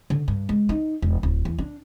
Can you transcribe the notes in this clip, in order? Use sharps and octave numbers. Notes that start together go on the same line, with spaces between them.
D3
G2
G#3
D#4
E1
D1
E2
D4